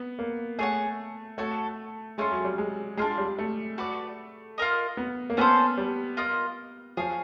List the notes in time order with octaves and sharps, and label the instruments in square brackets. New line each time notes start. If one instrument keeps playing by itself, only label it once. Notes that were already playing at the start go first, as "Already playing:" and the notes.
Already playing: [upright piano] B3
A#3
[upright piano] A3 [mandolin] G#4 C#5 F#5
[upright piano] A3 [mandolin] F#4 A4 C#5
[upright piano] G#3 [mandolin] A3 C#4 F4
[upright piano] F#3
G3
G#3
[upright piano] G#3 [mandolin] D4 F4 G#4
[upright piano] G3
A3
[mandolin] F#4 B4 D5
F4 A#4 D#5
[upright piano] B3
A#3
[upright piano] B3 [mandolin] C#4 F#4 A4 C5
[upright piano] G3
[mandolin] F4 A#4 D#5
[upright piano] F3 [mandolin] G#4 C#5 F5